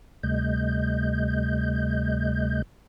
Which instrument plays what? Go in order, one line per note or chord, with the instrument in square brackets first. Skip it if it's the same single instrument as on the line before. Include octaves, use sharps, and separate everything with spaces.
[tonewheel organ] D2 C3 G3 A3 D#5 G6